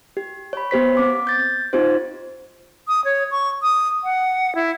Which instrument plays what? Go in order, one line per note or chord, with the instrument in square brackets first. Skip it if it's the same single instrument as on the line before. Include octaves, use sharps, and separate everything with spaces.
[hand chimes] G4
C#5 B5
B3 G4 C5 B6
C4 D6
G6 A6
C4 D#4 F4 G4 C5
[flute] D#6
C#5
C#6
D#6
F#5
E4